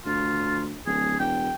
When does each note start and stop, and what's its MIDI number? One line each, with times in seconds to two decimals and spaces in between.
0.06 0.79 38
0.06 0.62 65
0.87 1.15 26
0.87 1.17 68
1.19 1.50 28
1.19 1.55 79